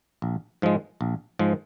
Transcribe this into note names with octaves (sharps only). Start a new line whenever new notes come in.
A#1
G#2 F3 G#3
A#1
G#2 F3 G#3